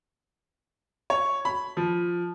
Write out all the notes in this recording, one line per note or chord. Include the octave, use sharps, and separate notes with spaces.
C#5
B5
F3